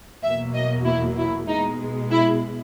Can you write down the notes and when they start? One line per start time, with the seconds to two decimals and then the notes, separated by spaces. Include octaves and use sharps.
0.23 E2 B2 F#3 A#3 E5
0.54 D#5
0.85 E4
1.16 E4
1.47 B2 G#3 D#4
2.11 E4